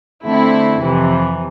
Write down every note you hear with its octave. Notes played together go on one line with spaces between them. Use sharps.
D3 A3 C4 E4
F2 C3 E3